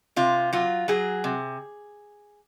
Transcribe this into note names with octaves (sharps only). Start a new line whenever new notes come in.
C3 F4
F#3 F4
F#3 G#4
C3